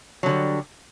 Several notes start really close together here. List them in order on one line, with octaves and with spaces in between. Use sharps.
F#3 D3 G3